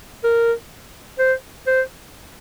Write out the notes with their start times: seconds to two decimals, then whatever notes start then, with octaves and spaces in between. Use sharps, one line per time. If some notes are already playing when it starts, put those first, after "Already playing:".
0.24 A#4
1.19 C5
1.67 C5